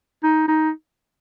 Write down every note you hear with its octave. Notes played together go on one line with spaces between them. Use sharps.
D#4
D#4